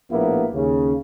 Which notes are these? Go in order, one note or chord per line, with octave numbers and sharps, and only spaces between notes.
A#1 A2 A#3 B3 E4
D#2 C#3